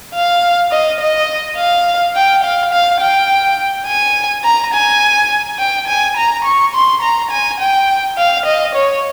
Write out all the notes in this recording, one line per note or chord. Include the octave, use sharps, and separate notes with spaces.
F5
D#5
D#5
F5
G5
F5
F5
G5
G#5
A#5
G#5
G5
G#5
A#5
C#6
C6
A#5
G#5
G5
F5
D#5
C#5